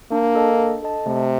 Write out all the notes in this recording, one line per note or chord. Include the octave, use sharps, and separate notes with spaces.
A#3 D4
A4 D#5 A5
D4
A4 D#5 A5
C3 A3